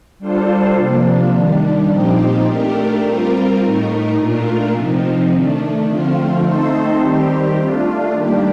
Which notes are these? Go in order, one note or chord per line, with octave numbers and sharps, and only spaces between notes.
G3 D4 F4 A4 C5
C3 F3 A#3 D4
D#3 G3 D4
A#2 F3 C4 D#4 G4
A3 D4 G4 A#4
G3 C4 F4 A#4
A2 A3 D#4 A#4
A#2 A3 D4 F4 A#4
C3 F3 C4 D#4
D#3 A3 D4
D3 F3 A3 C4 F4
A3 C4 D#4 A4 C5
D#3 G3 C4 G4
A3 D4 F4
D#3 G3 A#3 D4 G4